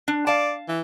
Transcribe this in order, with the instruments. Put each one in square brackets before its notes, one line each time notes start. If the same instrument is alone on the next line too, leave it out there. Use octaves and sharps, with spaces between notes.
[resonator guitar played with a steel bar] D4
[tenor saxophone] D5 [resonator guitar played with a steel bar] F5 A5
[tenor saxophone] E3